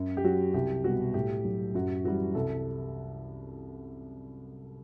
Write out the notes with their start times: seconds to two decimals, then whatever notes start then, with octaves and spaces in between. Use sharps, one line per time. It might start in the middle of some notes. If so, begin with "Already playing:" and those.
Already playing: F#2
0.17 G4
0.24 F#3 F#4
0.54 C2 G4
0.84 B2 G3 F#4
1.14 A2 G4
1.45 F#3
1.75 F#2 F#4
2.04 E3 G3 F#4
2.35 C2 A4